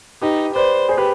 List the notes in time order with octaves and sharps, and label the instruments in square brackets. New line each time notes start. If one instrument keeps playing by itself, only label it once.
[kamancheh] D#4 [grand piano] G4 B4
[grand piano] B4 D5 [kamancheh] C5
[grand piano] G#4 C5
G4 B4